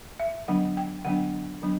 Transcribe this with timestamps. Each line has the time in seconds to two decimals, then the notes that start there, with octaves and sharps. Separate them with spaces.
0.20 E5
0.48 D3 F#3 B3 D4 F#5
0.77 G5
1.05 D3 F#3 B3 D4 F#5
1.62 D3 F#3 B3 D4